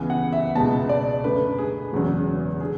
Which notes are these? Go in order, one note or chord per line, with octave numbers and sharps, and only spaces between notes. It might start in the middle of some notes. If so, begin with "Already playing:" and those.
Already playing: C#2 C#3 E3 B3 G#5
F#5
E5
C#2 B2 G#3 B3 A5
D5
F#2 D3 A3 B4
G#4
E1 E2 C#3 F#3
D3 G#4